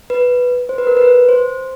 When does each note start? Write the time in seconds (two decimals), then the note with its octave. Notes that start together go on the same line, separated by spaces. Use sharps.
0.10 B4
0.69 C5
0.78 B4
0.87 A#4
0.97 B4
1.29 C5